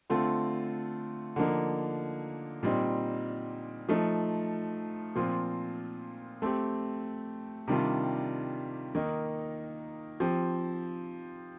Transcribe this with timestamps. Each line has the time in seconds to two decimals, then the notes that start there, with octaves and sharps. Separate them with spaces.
0.10 D3 A3 C4 F4
1.36 D3 F3 A#3 D#4
2.63 A#2 G3 C4 D#4
3.89 F3 A3 D#4
5.16 A#2 F3 C4 F4
6.42 A3 C4 G4
7.68 C3 D#3 G3 D4 F4
8.95 D#3 A#3 D#4
10.20 F3 C4 G4